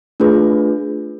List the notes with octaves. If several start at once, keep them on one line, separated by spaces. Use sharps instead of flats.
A3 D4 F4 G#4 B4